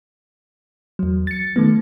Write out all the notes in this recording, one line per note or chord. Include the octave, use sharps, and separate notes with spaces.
E2 F#3
A6 C#7
D#3 A3 B3